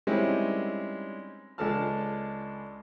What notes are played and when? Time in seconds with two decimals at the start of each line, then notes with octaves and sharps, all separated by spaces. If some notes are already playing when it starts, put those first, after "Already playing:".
0.07 D#3 G3 G#3 C4 C#4 E4
1.58 C#2 G#3 D4 A4 A5 F6